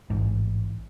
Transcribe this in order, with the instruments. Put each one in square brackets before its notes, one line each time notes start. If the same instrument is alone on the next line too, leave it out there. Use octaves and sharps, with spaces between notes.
[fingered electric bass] A1 G#2